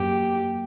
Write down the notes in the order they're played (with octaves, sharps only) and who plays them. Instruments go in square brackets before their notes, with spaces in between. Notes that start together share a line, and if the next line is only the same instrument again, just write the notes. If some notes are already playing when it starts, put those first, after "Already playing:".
Already playing: [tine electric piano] F#2 F#3 A#3 [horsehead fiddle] G4